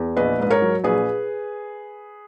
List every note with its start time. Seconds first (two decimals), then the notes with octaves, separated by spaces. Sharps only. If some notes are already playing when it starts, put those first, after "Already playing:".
Already playing: E2
0.17 A#1 B4 D#5
0.39 G#2 B4
0.50 A#4 C#5
0.62 F#3
0.84 A#1 G#4 B4